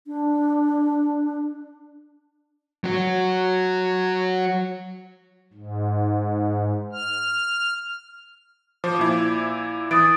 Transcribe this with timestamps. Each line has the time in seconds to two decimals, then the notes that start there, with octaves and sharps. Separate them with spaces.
0.07 D4
2.84 F#3 F#4
5.53 G#2
6.93 F6
8.84 F3 C5 D6
8.99 A#2 E4
9.91 E3 D#6 A6 D7